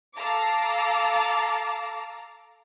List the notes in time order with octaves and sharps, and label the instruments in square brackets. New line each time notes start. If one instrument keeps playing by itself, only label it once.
[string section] A4 F5 A5 A#5 D6